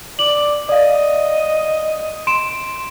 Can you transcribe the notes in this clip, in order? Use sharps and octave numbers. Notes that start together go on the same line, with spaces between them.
D5 F#7
D5 D#5 F5
C6 D7 E7